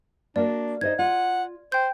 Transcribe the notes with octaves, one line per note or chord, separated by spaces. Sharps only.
A#3 D4 F#4 A#4 D5
D#4 C5 D#5 G#6
F4 F#5
C5 G5 G6